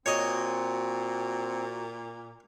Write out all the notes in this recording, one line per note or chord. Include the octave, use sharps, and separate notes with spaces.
A#2 C4 F#4 C#5 D#5